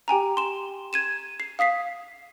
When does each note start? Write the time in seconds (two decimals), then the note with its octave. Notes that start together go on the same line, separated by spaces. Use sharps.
0.08 G4 G5 G#5 A#5
0.37 C6 E7
0.93 G#6 D#7 E7
1.40 C7
1.59 F5 D#6 B6 C7